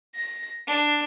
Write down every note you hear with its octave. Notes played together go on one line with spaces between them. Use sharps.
A#6
D4